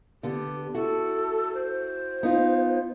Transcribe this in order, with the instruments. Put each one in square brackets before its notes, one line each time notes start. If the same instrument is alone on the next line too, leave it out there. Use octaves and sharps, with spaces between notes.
[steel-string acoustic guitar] D3 B3 [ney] G4
[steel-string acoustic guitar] E4 F#4 [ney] A4
[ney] C5
[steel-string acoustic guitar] B3 D#4 F4